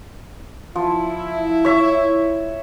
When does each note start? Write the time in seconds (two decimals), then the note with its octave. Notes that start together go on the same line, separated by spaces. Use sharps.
0.75 F3 E4
1.65 C#5 E5